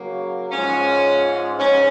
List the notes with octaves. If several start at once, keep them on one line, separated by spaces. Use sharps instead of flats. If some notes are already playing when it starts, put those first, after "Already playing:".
Already playing: C#3 F#3 A#3
G#2 F3 G#3 C#4
G#2 C#4